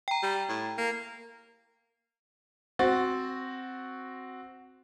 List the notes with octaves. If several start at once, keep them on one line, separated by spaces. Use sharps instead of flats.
G5 A#5
G3
A2
A#3
C4 F#4 A6